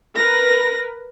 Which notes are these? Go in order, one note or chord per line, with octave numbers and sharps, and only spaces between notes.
A#4 B4 A#6